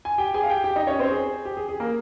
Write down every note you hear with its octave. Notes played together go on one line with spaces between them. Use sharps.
G#5
G4 G5
G#4 G#5
F5
G4 G5
G4 G5
D#4 D#5
C#4 C#5
C4 C5
G#4
G4
G#4
G#4
A#3 A#4